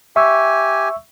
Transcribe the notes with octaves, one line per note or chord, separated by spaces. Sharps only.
G4 E5 G#5 C#6 E6